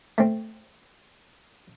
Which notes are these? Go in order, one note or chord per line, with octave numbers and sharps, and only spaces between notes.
A3 C4